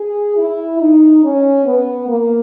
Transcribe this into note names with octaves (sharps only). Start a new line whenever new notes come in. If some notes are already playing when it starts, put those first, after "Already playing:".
Already playing: G#4
E4
D#4
C#4
B3
A#3